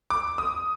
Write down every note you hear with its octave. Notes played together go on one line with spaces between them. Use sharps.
D6
D#6